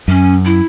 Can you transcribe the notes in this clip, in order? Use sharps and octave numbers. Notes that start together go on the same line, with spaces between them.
F#2 C#4
E4